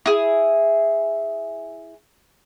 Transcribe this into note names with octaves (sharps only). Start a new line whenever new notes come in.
E4 G#4